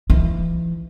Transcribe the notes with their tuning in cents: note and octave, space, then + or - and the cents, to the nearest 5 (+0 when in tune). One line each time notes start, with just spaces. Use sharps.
E3 +35 D#4 +45